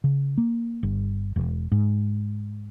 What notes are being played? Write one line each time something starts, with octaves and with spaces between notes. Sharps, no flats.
C#3
A#3
G1
E1
G#2